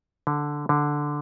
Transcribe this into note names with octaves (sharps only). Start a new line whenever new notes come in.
D3
D3